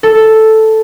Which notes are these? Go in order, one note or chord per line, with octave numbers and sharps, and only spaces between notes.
A4